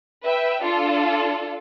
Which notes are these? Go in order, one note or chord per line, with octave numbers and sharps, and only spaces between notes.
B4 E5 G5
D4 F4 A4